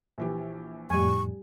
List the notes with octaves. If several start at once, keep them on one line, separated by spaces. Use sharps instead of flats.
A#1 E3 G4
F2 A2 G3 G#5 C#6